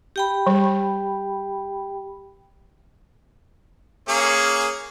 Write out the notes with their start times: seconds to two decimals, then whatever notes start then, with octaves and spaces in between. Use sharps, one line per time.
0.16 G4 G5 B5
0.46 G3
4.09 A#3 C#4 G#4